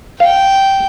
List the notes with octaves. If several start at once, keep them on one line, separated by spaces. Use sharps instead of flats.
F5 G5